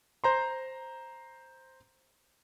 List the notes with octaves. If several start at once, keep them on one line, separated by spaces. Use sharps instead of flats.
C5 A#5 C6